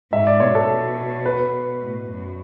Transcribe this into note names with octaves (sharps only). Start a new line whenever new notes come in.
G#2 E5
D5
B2 C#5
A4
B4
A2
F#2